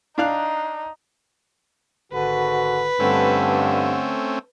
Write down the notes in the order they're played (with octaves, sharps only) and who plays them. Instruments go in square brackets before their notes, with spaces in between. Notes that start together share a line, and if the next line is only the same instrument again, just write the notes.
[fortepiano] D4 F5 F#6 [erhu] D#4
[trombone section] G#1 F#4 [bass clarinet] D3 [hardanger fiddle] B4
[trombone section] G2 [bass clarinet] D3 [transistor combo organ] A3 C4 C#4